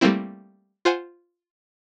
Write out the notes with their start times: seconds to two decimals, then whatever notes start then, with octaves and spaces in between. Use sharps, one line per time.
0.01 G3 A3 A#3 C4 E4
0.85 F4 C5 F#5 G#5